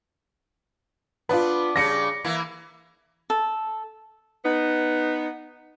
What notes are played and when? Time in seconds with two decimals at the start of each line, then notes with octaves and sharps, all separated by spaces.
1.29 B3 D4 F4 B4
1.76 C#3 G3 D4 A#6 C#7
2.24 E3 A#3 E4
3.30 A4
4.44 B3 D#4